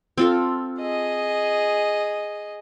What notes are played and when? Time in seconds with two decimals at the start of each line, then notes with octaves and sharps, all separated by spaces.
0.18 C4 F4 A4
0.81 G#4 D#5